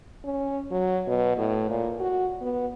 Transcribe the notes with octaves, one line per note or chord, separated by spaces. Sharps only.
C#4
F#3
B2
A2
A#2
F#4
B3